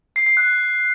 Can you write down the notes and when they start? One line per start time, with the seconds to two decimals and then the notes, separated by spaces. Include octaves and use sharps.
0.16 C7
0.26 C7
0.37 F#6